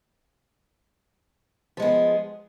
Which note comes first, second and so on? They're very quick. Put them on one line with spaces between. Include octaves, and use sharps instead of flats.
F3 G#3 B3